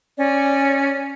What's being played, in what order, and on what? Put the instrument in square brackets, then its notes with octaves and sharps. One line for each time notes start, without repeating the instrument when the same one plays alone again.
[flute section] C#4 D5